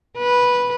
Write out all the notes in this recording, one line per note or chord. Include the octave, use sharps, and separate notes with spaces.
B4